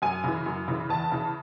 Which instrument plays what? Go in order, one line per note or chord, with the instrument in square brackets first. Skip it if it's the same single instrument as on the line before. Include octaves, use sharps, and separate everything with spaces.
[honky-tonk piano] F#2 G#5
C#3 E3
F#2
C#3 E3
E2 A5
C#3 E3